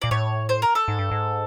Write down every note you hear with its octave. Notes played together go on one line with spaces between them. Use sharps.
A#2 D5
A2 C#5
C5
A#4
A4
G#2
G2
G#2